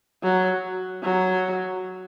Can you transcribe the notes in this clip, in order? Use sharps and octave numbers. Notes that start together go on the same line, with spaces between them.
F#3
F#3